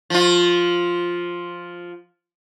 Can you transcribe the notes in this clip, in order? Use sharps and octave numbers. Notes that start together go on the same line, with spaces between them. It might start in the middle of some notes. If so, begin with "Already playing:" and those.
F3 F4